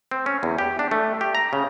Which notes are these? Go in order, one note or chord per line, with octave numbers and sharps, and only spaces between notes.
C4
C#4
E2
G4
D4
A3
G4
A#5
C#3